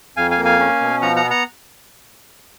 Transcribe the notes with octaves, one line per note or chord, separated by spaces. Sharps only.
F2 F5 G#5
F5 G#5
A#3
F5 G#5
C#4
B2
F3 F#5 A#5
F#5 A#5
B3
F#5 A#5